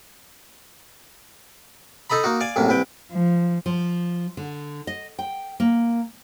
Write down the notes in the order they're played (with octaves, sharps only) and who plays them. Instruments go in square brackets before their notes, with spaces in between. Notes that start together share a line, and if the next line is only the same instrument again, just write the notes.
[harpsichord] D#4 A4 D#5 A#5 B5
A#3 D#4 F#4
D5 F5 G#5
C2 F#2 A2 A#3
C2 B4 G5
[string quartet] F3
[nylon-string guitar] F3
D3
D#5
G5
A#3